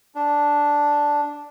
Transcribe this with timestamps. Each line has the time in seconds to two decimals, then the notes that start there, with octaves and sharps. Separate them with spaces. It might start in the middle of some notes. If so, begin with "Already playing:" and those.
0.15 D4